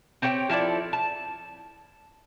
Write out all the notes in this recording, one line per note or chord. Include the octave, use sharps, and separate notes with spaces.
C4 G4 C#5 G5
F3 E4 A4 D5
A5